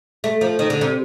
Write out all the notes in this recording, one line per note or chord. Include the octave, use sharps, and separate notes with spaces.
A3
F3
D#3
D3
C3